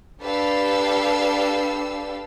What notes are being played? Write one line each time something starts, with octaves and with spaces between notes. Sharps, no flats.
D4 G4 A4 B4 F5 E6